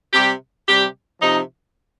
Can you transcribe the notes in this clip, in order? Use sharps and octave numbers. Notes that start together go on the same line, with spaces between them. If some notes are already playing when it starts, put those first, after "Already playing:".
C3 G3 G4
C3 G3 G4
C3 F3 D#4